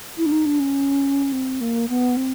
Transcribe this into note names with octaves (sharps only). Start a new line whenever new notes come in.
E4
D4
D#4
D4
C#4
C4
A#3
B3
C4